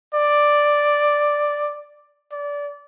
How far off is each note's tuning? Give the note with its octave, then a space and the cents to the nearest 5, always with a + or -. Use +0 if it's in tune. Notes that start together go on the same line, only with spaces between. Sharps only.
D5 +5
D5 -25